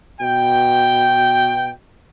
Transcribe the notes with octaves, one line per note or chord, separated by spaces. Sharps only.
B2 G5